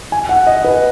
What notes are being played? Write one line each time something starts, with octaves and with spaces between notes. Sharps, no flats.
G#5
F#5
D#5
B4